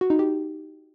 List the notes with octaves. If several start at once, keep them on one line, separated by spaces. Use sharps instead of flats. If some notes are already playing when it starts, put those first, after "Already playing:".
F#4
D#4
G4